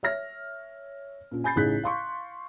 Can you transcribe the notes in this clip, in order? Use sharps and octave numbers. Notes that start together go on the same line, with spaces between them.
C#5 E5 F6 A#6
A#2 C#4
G#5 B5 G6 A6 C7
A1 C#3 D#4 G#4 F#6 B6
F5 C6 C#6